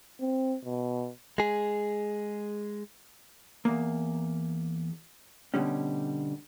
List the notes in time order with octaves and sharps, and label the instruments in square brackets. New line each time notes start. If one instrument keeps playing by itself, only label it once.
[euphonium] C4
B2
[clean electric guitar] G#3 G#4
[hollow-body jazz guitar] E2 A#3
B2 D3 G3 C#4